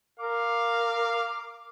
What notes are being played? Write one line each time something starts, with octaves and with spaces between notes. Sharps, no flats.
A#4 F5 D6